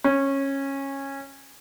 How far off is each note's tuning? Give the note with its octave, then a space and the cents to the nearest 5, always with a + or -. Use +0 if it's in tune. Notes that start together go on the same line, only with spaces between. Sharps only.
C#4 -15